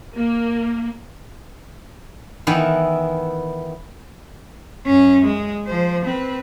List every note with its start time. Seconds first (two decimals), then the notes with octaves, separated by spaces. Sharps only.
0.15 A#3
2.47 D#3 E3 B3 E4
4.87 F#2 C#4
5.25 G#3
5.66 F3 C5
6.05 C4 B4